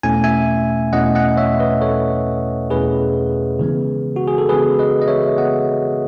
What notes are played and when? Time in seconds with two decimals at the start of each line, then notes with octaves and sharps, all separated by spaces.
0.03 E2 B2 A3 C#4 E4 G#5
0.24 E5 G#5
0.93 E2 B2 A3 C#4 E4 D#5 F#5
1.15 D#5 F#5
1.37 C#5 E5
1.60 B4 D#5
1.81 E2 B2 A3 C#4 E4 A4 C#5
2.70 E2 B2 A3 C#4 E4 G#4 B4
3.59 C#3 E3 G#3 B3
4.16 F#4
4.28 G#4
4.38 A4
4.49 C#3 E3 G#3 B3 G#4 B4
4.79 B4 D#5
5.02 D#5
5.08 C#5 E5
5.38 C#3 E3 G#3 B3 D#5 F#5